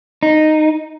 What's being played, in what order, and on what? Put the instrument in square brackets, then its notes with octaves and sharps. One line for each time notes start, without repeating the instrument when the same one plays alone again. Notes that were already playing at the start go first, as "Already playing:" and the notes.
[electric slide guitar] D#4